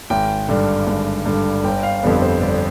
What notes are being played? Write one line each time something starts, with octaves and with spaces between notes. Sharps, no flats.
G#1 G5
G2 D3
G#1
G2 D3
G1 G5
F5
F2 D3 G3 B3
C5
G1 D5